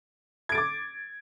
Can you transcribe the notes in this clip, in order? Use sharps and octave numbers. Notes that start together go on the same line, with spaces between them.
D6 G#6 A6 D7